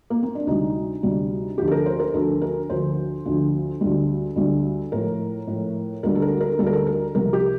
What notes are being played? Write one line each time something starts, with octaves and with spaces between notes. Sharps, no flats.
A#3
C4
D4
D2 C3 G3 D#4
D2 C3 G3
D2 D3 F3 G4
A4
A#4
C5
A#4
D2 D3 F3 A4
A#4
D2 D3 F3 C5
D2 D3 F3
D2 D3 G3
D2 D3 G3
A2 F3 A#4
A2 F3
D2 D3 G3 A#4
A4
A#4
A#4
D2 D3 G3 A4
A#4
A4
A#4
C2 C3 F3 A#4
G4